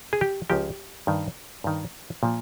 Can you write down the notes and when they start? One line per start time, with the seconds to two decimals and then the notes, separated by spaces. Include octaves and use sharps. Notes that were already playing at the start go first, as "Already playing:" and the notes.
0.13 G#4
0.21 G4
0.50 C#2 C#3 F3 G4
1.07 G2 D#3
1.64 G2 D#3
2.23 A#2 F3